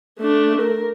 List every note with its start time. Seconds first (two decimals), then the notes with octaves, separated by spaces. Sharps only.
0.19 A3 D4
0.61 A#4